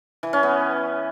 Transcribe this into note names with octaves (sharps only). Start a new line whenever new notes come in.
E3
C#4
B3